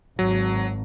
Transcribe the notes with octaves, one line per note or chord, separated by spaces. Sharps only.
G#1 F#3